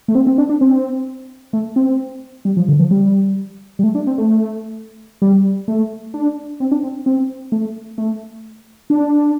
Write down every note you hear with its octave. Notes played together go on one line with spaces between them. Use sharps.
A3
C4
C4
D4
D4
C4
A3
C4
G3
F3
D3
F3
G3
G3
A3
D4
C4
A3
G3
A3
D4
C4
D4
C4
C4
A3
A3
D4